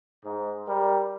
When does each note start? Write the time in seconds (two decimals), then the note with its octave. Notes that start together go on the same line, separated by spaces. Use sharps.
0.25 G#2
0.67 G3 A#4